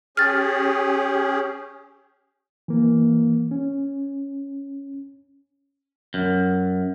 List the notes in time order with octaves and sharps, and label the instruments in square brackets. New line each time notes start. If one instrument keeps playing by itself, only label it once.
[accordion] C#4 G4 G#4 [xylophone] F6 A6
[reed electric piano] E3 A#3
C#4
[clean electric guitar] F#2